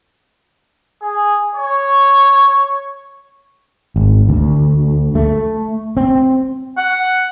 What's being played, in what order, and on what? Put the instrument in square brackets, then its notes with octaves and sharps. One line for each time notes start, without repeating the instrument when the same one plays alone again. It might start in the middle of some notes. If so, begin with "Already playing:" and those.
[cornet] G#4
C#5
[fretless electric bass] G#1
D2
A3
C4
[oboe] F#5